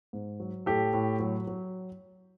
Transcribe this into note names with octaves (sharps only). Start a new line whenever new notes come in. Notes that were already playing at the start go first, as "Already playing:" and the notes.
G#2
F#3
A2 G4 A4
A2
F#3
F#3